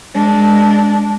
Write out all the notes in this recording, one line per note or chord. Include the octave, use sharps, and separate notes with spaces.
G#3 D4